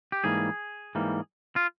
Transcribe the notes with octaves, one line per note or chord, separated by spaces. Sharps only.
G4
G#2 E3 G3 A#3 G#4
G#2 E3 G3 A#3
F4